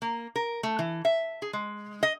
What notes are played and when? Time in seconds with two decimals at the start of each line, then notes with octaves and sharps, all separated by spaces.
0.02 A#3
0.36 A#4
0.63 A3
0.79 E3
1.05 E5
1.42 G#4
1.53 G#3
2.03 D#5